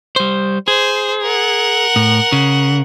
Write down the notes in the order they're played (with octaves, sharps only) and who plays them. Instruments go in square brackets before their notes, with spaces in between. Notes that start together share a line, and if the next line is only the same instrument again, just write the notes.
[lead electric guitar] G3 C5
[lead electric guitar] G#4 [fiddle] C5
[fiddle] A#4 F#5
[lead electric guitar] A2
C#3